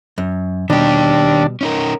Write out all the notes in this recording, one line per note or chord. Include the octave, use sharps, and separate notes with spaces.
F#2
B2 D#3 G3 D4 G4
C#4 D#4 A#4